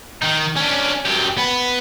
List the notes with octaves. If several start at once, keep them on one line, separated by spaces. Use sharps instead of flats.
D#3 D#4
C#4 D4
F#2 G4
B3